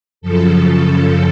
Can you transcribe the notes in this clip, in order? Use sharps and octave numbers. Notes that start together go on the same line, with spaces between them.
F#2 C#3 F3 A4